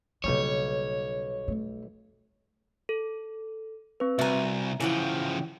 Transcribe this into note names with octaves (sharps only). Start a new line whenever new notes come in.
B1 C#3 G3 A#3 C#5 G#5
A3
A4
C4 B4
C2 F#4 E5 G#5 A#5
C#3 E3 F3 F#5 G5